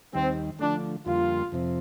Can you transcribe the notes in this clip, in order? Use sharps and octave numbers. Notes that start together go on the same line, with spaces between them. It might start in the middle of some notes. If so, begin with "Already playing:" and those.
D#2 D#3 G3 C4
D3 F3 A3 D4
F2 D3 G3 A#3 F4
F2 C3 F3 C4